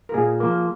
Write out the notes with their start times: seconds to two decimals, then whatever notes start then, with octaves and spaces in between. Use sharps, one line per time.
0.09 A#4
0.14 A#2 G#4
0.40 F3 A#3 A#4